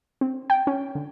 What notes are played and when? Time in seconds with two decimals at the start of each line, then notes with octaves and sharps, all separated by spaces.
0.21 C4
0.50 G5
0.67 C#4
0.95 D3